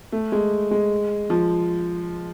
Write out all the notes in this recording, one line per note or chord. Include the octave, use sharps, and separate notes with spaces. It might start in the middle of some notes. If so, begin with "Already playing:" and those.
A3
G#3
G#3
F3